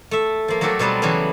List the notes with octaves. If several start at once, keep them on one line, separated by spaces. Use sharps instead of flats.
A3 E5
F3 A#3
F#3 A3 F#4 G4 A4 A#4
B2 F#3 G3 B3 C4
C#3 E3 F#3 G3 B3 C#4